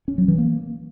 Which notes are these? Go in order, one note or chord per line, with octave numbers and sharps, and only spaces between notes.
C#4
F#3
E3
A#3